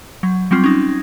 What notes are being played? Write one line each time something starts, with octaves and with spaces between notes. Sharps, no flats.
F#3
F#3 G3 C4 F4
C#4 D#4